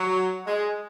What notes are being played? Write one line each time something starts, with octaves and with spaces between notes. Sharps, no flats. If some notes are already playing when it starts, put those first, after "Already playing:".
Already playing: F#3
G#3